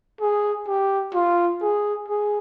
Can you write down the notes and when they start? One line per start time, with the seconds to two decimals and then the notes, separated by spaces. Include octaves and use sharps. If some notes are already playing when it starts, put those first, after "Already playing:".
0.21 G#4
0.68 G4
1.14 F4
1.62 G#4
2.08 G#4